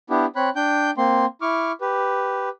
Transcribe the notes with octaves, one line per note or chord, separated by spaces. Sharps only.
B3 D4 E4 G4
C4 C#5 B5 F#6
D4 G5 G6
A#3 C4 C6
E4 C#6 D6 F6
G4 B4